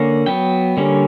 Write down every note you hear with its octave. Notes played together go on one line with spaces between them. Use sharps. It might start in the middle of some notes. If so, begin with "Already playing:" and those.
Already playing: D3 A#3 C#4 F#5
F#3 B3 G5
D3 G3 A#3 C#4